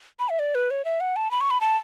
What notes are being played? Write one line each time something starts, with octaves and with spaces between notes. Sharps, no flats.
B5
E5
D5
B4
C#5
E5
F#5
A5
B5
C#6
B5
A5